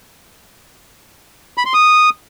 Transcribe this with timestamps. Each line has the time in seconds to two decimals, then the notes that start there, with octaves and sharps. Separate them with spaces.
1.58 B5
1.66 C6
1.74 D#6